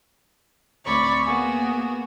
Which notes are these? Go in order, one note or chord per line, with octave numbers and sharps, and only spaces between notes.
D2 C4 C#5 D5 B5 C#6
A#3 B3 F#4 G#4